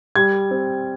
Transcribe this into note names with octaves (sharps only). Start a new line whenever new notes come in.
G3 G#6
C4